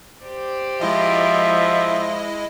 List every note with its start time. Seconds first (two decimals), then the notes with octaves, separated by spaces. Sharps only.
0.24 G4 C5 D5
0.81 F3 G#3 E4 D#5 E5